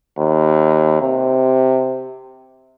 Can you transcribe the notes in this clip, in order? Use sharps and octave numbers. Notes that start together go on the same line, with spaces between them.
D#2
C3